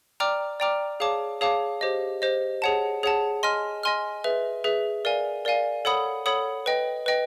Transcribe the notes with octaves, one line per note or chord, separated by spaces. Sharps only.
D5 G5 A#5 D6 F6
D5 G5 A#5 D6 F6
G#4 C#5 F5 A5 D6
G#4 C#5 F5 A5 D6
G4 C5 D#5
G4 C5 D#5
G#4 C#5 F#5 A5
G#4 C#5 F#5 A5
D#5 G#5 C6 F6
D#5 G#5 C6 F6
G#4 B4 E5
G#4 B4 E5
A#4 D5 F5 G#5
A#4 D5 F5 G#5
A4 C#5 F#5 B5 D#6
A4 C#5 F#5 B5 D#6
B4 D#5 G5
B4 D#5 G5